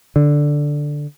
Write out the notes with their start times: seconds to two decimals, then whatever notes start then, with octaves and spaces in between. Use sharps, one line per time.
0.16 D3